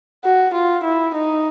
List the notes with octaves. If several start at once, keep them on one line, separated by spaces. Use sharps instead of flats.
F#4
F4
E4
D#4